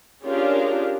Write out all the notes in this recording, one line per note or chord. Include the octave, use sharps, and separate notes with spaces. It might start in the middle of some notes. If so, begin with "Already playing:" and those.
C#4 D4 F4 G4 G#4 A#4